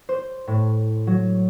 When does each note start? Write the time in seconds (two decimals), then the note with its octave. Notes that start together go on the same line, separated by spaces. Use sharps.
0.09 C5
0.47 A2
1.07 F#3